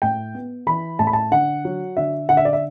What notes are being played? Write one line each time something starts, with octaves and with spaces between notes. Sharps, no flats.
A2 G5
B3
E3 B5
A2 A5
B5
A5
D3 F#5
F#3
D3 E5
D3 F#5
E5
D5
E5